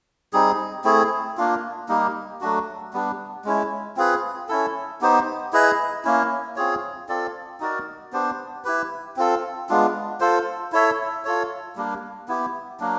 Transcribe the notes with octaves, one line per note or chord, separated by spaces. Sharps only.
G3 C4 D#4 G#4
A3 C4 E4 G#4
A#3 D4 F4
G3 A#3 D#4 G4
F#3 A3 D4 F#4
G3 B3 D4
G#3 C#4 E4
C4 F4 G#4 B4
C#4 E4 A4
B3 D#4 G4 C5
E4 G#4 B4 D#5
A#3 C#4 E4
C4 F4 G#4 C#5
C4 F4 A4 D5
D#4 F#4 A#4 D5
B3 D4 G4 C5
E4 G4 B4
C4 F4 A4
G#3 B3 D4 F4
F4 A4 C5
E4 A4 C#5 E5
F4 A4 C#5
G3 A#3 D4
B3 E4 G4
F#3 A#3 D4